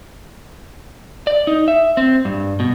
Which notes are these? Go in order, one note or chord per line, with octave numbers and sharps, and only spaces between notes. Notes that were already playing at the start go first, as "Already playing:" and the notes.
D5
D#4
E5
C4
G2
B2